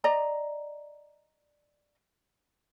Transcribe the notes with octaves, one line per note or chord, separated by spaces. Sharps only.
D5 D#5 A#5